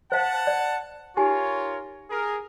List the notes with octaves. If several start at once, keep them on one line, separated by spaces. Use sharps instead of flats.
C5 F5 F#5 A5
D5
D#4 F4 G4 A#4 C#5 G#5
G#4 A#4